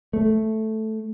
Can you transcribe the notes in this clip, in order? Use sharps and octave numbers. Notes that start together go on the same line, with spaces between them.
A3